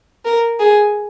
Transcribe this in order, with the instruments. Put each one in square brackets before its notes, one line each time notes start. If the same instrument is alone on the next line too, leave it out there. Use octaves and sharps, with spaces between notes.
[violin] A#4
G#4